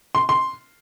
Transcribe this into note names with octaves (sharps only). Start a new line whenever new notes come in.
C6
C6